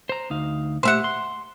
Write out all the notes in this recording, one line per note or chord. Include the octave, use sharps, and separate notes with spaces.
C5 A#5
D2 D#4 F5
A#2 A3 G4 C5 E5 F#5
C6